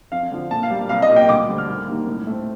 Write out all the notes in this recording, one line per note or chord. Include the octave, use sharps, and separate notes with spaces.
F2 F5
D3 F3
A#2 A5
F5
G3 A#3
C2 F5
D#5
A#2 G3
G5
D2 D6
D3 G3 C4
F6
D#2
D#3 G3 A#3
A2
A3 C4